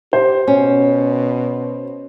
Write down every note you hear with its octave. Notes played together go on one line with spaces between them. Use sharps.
G4 C5
B2 C#4